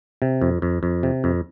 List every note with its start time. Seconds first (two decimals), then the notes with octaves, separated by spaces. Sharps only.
0.22 C3
0.41 F2
0.62 F2
0.83 F2
1.03 C3
1.24 F2